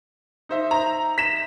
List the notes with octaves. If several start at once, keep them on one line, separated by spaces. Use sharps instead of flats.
D#4 C5 E5
A#5
B6 E7